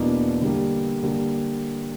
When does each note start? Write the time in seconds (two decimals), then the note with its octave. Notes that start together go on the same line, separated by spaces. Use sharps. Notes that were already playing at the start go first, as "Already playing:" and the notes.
Already playing: E2 B2 A#3 D4
0.41 D3 G3 A#3
1.03 D3 G3 A#3